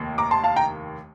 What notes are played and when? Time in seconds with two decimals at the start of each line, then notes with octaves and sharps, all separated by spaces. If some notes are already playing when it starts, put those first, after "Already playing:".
Already playing: F1 D#2 D#3 A#3
0.18 A#5 D6
0.31 A5 C6
0.44 F5 A5
0.56 G5 A#5